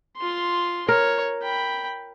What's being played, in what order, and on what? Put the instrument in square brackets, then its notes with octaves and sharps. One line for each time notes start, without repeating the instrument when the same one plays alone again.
[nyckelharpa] F4 C6
[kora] A#4 [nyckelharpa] C#5
[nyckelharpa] G5 B5